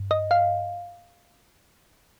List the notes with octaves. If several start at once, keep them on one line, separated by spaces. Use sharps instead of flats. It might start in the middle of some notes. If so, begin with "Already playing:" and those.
Already playing: G2
D#5
F5